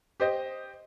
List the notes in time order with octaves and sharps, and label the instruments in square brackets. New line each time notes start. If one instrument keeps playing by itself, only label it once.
[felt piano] G4 C5 D#5